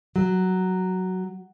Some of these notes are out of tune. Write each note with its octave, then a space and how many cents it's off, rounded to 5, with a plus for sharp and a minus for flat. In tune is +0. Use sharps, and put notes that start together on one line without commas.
F#3 +5